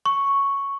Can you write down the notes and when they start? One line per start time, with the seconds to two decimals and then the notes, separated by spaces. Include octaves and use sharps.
0.06 C#6